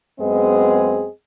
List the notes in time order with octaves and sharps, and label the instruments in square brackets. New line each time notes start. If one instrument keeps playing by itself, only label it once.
[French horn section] F#2 G#3 B3 C4 G#4 D#5